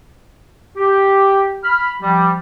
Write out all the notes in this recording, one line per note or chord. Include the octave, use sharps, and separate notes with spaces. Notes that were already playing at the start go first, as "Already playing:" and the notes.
G4
B5 F6
F3 G3